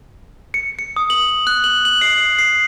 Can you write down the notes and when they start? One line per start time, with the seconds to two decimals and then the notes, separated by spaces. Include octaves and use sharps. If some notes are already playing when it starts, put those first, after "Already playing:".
0.54 C#7
0.79 C#7
0.96 D#6
1.10 F#7
1.47 F#6
1.64 F#7
1.85 F#7
2.01 C7
2.39 C7